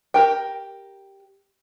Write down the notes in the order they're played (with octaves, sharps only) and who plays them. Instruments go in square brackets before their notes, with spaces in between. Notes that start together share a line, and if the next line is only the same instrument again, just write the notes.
[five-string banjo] G4 A#4 G5